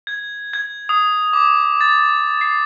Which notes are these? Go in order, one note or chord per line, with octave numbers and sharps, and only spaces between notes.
G#6
G#6
D#6
D6
A6
C7